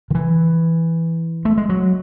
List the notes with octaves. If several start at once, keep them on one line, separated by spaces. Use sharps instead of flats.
D#3
E3
A3
G#3
F#3